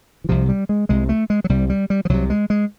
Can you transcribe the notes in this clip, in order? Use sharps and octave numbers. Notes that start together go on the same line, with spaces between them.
E3
C2 C3 F3
G3
G#3
C2 C3 G#3
A3
G#3
F#3
C2 C3 G3
G3
G3
F3
C2 C3 F#3
G#3
G#3